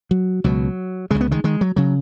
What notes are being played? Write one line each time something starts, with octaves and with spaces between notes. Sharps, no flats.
F#3
C#2 B2 F#3
C#2 C#3 G#3
B3
D#3 G#3
D#3 G#3
F#3
C#3 F#3